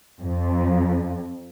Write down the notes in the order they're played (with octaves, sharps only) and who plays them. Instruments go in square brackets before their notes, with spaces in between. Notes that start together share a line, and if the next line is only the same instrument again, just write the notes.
[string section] F2